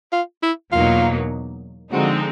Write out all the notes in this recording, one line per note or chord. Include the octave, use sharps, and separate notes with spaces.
F4
E4
E2 B2 F#3 A#3 D#4 F4
D3 F3 G#3 C4 D#4 F#4